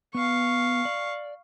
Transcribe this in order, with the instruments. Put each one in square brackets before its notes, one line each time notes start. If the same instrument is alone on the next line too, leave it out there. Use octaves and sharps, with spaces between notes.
[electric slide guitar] B3 [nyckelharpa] F5 C#6
[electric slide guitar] D5